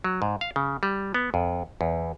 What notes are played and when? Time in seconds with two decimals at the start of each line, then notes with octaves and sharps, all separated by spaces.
0.04 F#3
0.22 G#2
0.41 F5
0.56 C#3
0.83 G3
1.14 B3
1.34 F2
1.81 E2